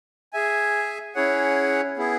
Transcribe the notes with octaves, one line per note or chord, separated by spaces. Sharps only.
G#4 E5 G#5
C#4 E4 G#4 C#5 F#5
B3 E4 G#4